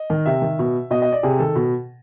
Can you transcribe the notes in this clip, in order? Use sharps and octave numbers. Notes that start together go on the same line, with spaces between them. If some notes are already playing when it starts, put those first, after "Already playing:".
Already playing: D#5
D#3
C3 E5
D#3
B2
B2 D#5
D#5
D5
C3 G#4
D#3 A4
B2